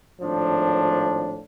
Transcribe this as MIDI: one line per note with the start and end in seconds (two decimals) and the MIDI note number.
0.21 1.39 32
0.21 1.39 45
0.21 1.39 53
0.21 1.39 62